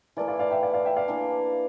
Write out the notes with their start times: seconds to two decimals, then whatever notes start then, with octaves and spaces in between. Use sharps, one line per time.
0.17 E3 A3 E4 A#4 D5
0.28 D5 F5
0.39 D5 F5
0.51 E5 G5
0.63 D5 F5
0.74 D5 F5
0.85 E5 G5
0.96 D5 F5
1.08 E3 A#3 D4